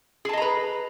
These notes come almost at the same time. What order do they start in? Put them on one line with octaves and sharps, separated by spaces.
G#4 A5 D#5 A#5 B4